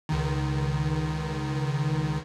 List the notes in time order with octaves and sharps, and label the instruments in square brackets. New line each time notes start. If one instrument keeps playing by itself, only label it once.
[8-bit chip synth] C#2 D#3